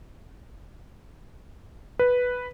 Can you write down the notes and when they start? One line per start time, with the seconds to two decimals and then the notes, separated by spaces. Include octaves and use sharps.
1.99 B4